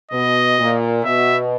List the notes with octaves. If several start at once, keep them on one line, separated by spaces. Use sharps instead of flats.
B2 D#5
A#2
B2 E5